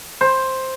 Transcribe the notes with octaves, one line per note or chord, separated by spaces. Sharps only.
C5